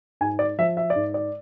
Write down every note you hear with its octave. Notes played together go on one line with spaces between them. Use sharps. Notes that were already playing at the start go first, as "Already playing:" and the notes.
G#2 G#5
D5
F3 E5
E5
D5
G#2
D5